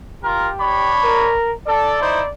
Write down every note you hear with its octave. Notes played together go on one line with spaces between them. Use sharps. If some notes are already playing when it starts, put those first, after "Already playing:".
F4 G4 A#4
D4 C#5 B5
A#4
A4 D5
D#4 E4 C5